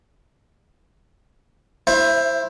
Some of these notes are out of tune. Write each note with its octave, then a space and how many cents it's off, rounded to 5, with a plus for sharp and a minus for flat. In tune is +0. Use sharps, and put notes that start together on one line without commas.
E4 +0 C5 +15 E5 +30